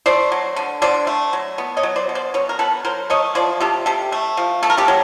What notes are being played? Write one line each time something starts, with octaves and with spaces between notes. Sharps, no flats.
A3 C5 D5
F#3
D3
D3 C5 D5
A3
F#3
B3
C#5 D#5
F#3
C5 D5
B2
C5 D5
B2 B4 C#5
A#4
B3 A4 B4
F#3 A#4 C5
A3 C#5 D#5
F3 C5 D5
C3 G4 A4
C3 G4 A4
A3
F3
A3 A4
A#4
G4 A4
F#3